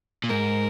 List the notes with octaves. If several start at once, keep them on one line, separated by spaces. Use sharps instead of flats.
A#2
G#2 A#4